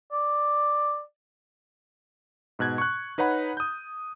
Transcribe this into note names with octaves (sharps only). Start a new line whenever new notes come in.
D5
G#2 B2 F#6 G#6
C#6 F#6
D#4 B4 C#5 F#5 B5
D#6 G6